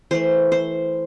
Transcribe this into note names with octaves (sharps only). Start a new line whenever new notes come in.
E3 A3 C5
C5